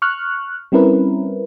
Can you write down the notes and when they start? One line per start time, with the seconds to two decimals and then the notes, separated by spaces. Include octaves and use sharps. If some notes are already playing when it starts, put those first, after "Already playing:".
0.02 C#6 F6 F#6
0.72 G3 C4 C#4 E4 A#4 B4